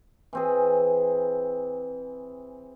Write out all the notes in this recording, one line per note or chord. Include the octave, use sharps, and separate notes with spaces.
E3 C4 G#4